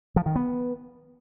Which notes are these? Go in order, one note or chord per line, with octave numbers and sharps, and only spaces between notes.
F3
D#3
B3